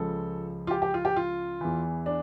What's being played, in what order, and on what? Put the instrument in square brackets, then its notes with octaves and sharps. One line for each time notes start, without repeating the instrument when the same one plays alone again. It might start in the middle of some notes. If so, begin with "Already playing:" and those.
Already playing: [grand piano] C#2 C#3 F3 A4
F4
G4
G4
F4
G4
F4
E2 E3
D4